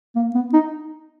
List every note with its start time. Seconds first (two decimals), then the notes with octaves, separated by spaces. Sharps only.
0.16 A#3
0.35 B3
0.53 D#4